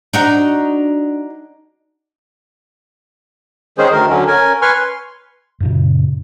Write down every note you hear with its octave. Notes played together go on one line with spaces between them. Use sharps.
D4 D#4 F#4
D#3 G#3 C#4 G#4 C5
D2 D#3 A#4
D3 F#3 C#4
C#4 A#4 G#5
B4 G#5 C6 C#6 F6
C6
F#2 A#2 C#3